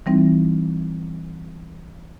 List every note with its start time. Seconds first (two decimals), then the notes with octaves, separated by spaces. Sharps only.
0.06 E3 G3 C4 D#4 E4